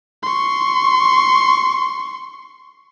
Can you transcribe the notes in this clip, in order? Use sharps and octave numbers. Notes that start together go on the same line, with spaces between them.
C6 C#6